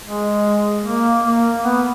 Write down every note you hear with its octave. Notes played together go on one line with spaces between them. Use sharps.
G#3
A#3
A#3
B3